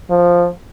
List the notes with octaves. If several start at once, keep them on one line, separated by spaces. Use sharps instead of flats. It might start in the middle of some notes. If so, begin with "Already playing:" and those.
F3